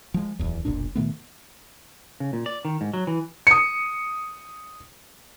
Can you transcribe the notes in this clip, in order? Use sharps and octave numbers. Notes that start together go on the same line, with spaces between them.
F3 G#3
D1 E2
F1 B1 A#2 D4
A#2 D#3 A3 B3
C#3
A#2
D5
D#3
G#2
F#3
E3
D#6 C#7